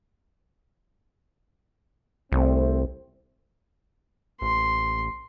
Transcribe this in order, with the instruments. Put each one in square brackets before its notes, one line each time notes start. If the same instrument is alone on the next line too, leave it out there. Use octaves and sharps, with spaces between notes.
[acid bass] C2 [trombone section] A3 C4
[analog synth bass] A1 [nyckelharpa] C6